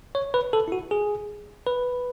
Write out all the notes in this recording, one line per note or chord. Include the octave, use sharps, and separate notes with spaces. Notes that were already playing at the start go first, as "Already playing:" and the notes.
C#5
B4
A4
E4
F#4
G#4
B4